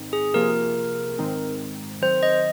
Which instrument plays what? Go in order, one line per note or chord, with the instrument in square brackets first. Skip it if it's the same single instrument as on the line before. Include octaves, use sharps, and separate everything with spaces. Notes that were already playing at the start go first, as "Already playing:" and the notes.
Already playing: [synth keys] G#2 D#3 C4 D#4
[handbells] G#4
[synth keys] C3 F3 A#3 F4 G#4 [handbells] A#4
[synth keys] G#2 D#3 G#3 C4 D#4
[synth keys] D#3 F#3 C4 [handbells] C5
[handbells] D#5